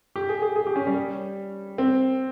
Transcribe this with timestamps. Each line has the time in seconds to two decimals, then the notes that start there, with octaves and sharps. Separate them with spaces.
0.16 G4
0.29 G#4
0.42 G#4
0.56 G#4
0.67 G4
0.76 C#4
0.87 G3
1.78 C4